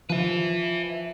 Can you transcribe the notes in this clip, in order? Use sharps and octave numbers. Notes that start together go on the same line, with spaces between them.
F3 B4 E5